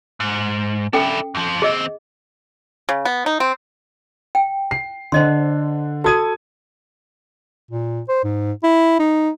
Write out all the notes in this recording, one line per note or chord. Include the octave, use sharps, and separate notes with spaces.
G#2
C#4 D4 E4 A4 G5
F2 F3
D#2 C4 G#4 D#5
C#3
B3
D#4
C4
G5
C7
D3 D4 C5 D#5 C6
F#4 A4 D#6 G#6 D#7
A#2
C5
G#2
E4
D#4